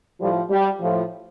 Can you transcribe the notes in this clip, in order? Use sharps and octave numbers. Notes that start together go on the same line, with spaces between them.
A2 F3 G3
G3
A2 F3